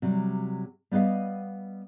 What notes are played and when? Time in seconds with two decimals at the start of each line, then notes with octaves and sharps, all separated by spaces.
0.02 C3 F#3 G3
0.91 G3 B3 B4 D#5 F5